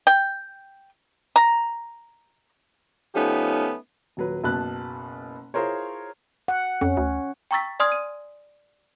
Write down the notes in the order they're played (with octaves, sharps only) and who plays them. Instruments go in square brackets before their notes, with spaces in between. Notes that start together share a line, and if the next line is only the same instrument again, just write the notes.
[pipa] G5
A#5
[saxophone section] F3 A3 B3 C#4 D#4 G4
[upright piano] D#1 F#3 B4
F#1 B2 B4 A5 B5 F#6
E4 F4 G#4 A#4 C5 C#5
[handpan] F#5
[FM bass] F2 [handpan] C#4
[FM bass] D2
[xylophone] G5 A#5 C#6 E6 A6 B6
D5 G#5 C6 D#6 F6 G#6
D#7